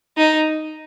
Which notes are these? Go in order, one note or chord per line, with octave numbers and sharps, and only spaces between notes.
D#4